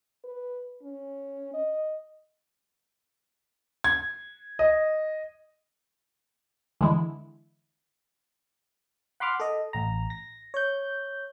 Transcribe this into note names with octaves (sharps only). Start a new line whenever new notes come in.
B4
C#4
D#5
G#6
D#5
D3 E3 G#3 E4
F#5 B5 C6 D6 F6
A4 D#5
A1 A#5
A#6
C#5 G6